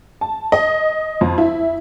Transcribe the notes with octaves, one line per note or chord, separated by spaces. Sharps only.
A5
D#5
F2
E4